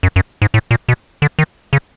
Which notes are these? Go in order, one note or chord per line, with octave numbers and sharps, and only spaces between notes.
F#2
F#2
G#2
A2
A#2
B2
D3
D#3
C#3